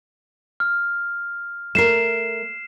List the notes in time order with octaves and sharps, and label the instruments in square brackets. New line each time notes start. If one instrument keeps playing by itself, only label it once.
[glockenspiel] F6
[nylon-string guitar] A3 A#4 [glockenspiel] C7 E7